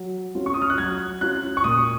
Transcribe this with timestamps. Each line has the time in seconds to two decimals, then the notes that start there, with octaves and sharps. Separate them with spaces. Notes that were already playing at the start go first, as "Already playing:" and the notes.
Already playing: F#3
0.35 C#4 F4
0.46 C#6
0.54 D#6
0.62 F6
0.70 F#6
0.78 F#3 G#6
1.21 C#4 F4 F#6
1.57 C#6
1.64 A#2 D#6